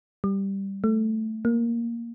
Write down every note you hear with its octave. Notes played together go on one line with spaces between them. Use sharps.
G3
A3
A#3